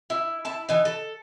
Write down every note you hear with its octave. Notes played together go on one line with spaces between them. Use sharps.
E4
E4 A5
E3 D#4
A4